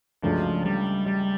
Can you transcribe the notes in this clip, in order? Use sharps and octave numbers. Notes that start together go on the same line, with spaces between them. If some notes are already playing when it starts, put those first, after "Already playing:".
C#2 C#3 F3 F#3 A3 D4
G3
G3